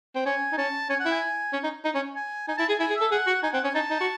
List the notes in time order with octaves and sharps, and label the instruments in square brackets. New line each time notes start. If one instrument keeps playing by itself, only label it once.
[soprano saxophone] C4
[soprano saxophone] C#4 [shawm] G#5
[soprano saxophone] D#4
[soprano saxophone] C#4 [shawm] A5
[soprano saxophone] C#4 [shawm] G#5
[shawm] F#5
[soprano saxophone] E4
[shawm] G#5
[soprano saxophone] C#4
D#4
D#4
C#4
[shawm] G#5
[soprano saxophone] D#4 [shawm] G#5
[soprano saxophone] E4 [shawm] A5
[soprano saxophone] G#4 [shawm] G#5
[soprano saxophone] E4 [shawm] G#5
[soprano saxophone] G#4
[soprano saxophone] A4 [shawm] E5
[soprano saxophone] G#4 [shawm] F#5
[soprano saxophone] F#4
[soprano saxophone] D#4 [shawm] G#5
[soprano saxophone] C4 [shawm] F#5
[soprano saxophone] C#4 [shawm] G#5
[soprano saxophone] D#4 [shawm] A5
[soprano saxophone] D#4
F#4